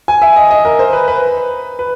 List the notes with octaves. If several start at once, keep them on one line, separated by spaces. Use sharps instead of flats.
G#5
E5
D#5
D#5
A#4
C5
B4
B4
B4